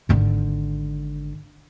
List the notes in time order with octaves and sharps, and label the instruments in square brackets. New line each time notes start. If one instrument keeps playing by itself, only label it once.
[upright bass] G#1 D3